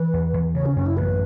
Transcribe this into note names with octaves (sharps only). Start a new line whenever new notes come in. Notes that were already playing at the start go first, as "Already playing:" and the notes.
Already playing: E3 B4
E2
E2
C#3 C#5
C#4
F#2 C#4
E4
A1 B4